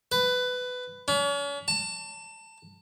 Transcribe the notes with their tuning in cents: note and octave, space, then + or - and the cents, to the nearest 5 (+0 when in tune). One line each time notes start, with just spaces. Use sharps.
B4 +15
C#4 +40
A5 +25